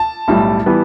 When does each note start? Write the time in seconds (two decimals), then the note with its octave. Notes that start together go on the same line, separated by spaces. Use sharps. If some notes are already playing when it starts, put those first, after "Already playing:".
Already playing: A5
0.28 B1 A2 G3
0.66 E3 G3 B3